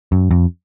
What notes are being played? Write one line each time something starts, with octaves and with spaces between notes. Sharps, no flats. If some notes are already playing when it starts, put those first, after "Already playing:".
F#2
F2